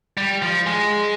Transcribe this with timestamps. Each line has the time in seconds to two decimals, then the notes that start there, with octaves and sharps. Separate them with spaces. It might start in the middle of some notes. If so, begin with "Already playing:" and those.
0.17 G3
0.42 F3
0.67 G#3